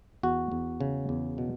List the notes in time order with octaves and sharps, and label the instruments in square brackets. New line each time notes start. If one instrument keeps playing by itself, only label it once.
[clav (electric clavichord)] E2 F#4
E2
C#3
E2
B2